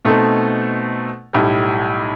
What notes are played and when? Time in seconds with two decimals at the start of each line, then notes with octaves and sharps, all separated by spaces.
0.05 B2 A3 C4 D#4 A4
1.33 B1 A2 G3